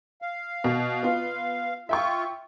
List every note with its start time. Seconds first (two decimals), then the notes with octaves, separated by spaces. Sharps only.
0.22 F5
0.64 B2
1.03 B3 F4
1.89 F4 E5 G5 C#6